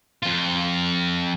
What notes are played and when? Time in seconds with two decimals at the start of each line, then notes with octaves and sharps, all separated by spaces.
0.23 F2 F4